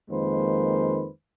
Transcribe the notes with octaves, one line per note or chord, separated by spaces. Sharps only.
F2 D#3 G#3 A#3 B4 C5